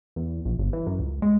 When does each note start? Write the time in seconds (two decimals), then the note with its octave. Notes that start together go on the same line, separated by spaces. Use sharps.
0.16 E2
0.45 A#1
0.59 G1
0.73 E3
0.87 F#2
1.00 C#2
1.22 G#3